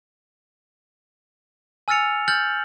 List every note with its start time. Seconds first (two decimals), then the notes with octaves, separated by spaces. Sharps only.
1.88 G#5 E6 F6 A6 C#7 F7
2.28 F6 G6 A6 F#7